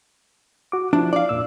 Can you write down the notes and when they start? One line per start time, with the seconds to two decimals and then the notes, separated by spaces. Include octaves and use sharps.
0.72 F#4 D6
0.93 F3 D4 E4
1.13 D5 F5
1.29 F2 A#2 E6